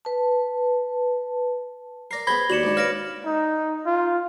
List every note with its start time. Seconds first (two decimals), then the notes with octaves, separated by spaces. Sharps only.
0.05 B4 A5
2.11 A#4 D5 A#6 C7
2.27 B3 G#4 C5 B5 G#6 A#6 B6 G7
2.50 D#2 F#4 D5 C#7 E7 F#7
2.63 G#2 D4
2.77 B4 C#5 F5 F6 A#6 D7
3.26 D#4
3.86 F4